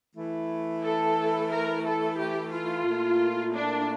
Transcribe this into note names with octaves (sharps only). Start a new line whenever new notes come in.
E3 A3 E4
A4
A#4
A4
G4
F4
A#2 A3 E4 A#4
D4